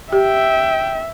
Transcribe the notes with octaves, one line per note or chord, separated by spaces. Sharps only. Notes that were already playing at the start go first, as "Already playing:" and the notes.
G4 E5 G5